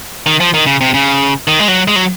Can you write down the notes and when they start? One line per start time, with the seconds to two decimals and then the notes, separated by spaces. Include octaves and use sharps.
0.26 D#3
0.40 F3
0.54 D#3
0.67 C#3
0.81 C3
0.94 C#3
1.47 D#3
1.59 G#3
1.68 F#3
1.88 G#3
1.96 F#3